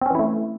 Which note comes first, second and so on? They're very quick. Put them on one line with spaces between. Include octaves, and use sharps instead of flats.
C4 C#4 E3 E4 A3